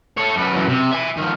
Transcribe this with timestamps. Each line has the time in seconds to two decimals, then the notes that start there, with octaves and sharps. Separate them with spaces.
0.18 A4 C#5
0.36 F#2 B4
0.53 F#2 E3
0.69 C3
0.91 E5 G#5
1.17 D#3 F3